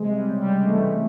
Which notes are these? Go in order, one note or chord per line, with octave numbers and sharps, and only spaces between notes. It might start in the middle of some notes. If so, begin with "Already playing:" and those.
Already playing: C3 G#3
G3
C#3
G3
C#3
G#3
E3 A3
G3